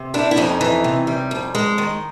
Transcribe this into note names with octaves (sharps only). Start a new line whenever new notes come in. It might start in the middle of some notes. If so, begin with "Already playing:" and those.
Already playing: C3
G3 D4 E4
E4
F2 C#4 D#4
E3
C3
G3
F2
G#3
D#3